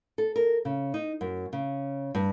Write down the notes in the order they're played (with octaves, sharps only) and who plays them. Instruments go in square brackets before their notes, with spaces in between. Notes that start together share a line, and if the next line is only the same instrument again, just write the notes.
[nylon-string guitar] A4
A#4
C#3
D#4
F#2
C#3
G2